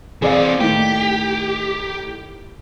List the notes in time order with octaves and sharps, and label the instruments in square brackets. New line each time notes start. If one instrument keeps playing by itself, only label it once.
[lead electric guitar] E3 C4 [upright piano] G#4 D5 F5
[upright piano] A2 D#3 [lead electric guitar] G4